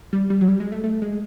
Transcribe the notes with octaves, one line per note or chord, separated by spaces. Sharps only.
G3
G3
F#3
G3
G#3
A3
A3
G#3